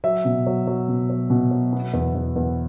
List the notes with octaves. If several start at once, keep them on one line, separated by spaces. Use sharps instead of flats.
F#3 E5
B2
F#3
F#3
B2
F#3
B2
F#3
B3
E2
E2
E2